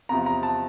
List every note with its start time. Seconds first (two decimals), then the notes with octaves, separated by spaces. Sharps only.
0.09 E2 C3 F3 A#5
0.26 A#5
0.43 A5